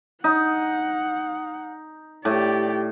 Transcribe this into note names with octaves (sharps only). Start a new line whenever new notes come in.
D#4 F#5
A2 G4 D5